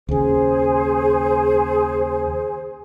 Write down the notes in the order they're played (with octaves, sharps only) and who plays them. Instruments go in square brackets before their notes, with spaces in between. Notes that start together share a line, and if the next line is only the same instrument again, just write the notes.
[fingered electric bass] D#2 C#3 [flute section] G#4 C5